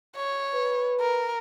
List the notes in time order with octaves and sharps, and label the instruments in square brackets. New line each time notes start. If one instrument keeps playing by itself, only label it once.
[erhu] C#5
[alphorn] B4
[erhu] A#4